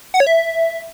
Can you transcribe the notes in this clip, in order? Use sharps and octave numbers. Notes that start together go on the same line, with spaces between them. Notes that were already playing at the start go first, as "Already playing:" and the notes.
F#5
C#5
E5